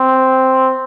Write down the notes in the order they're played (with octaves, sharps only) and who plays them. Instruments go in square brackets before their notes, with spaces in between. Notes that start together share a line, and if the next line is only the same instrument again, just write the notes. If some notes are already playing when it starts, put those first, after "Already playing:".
Already playing: [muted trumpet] C4